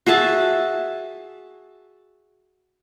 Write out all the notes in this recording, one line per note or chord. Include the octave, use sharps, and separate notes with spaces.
F#4 G#4 E5 A5